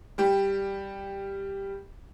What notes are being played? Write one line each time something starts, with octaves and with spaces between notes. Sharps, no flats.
G3 G4